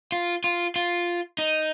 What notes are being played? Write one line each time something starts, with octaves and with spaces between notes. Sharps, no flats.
F4
F4
F4
D#4